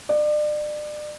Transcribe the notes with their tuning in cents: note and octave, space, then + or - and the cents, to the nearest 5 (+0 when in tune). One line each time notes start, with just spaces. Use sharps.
D5 +35